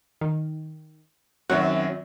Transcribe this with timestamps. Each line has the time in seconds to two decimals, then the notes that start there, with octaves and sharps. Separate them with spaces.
0.21 D#3
1.49 F#2 D#3 F#3 C4 F#4 E5